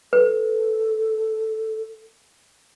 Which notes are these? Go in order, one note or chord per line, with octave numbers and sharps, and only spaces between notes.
A4 B4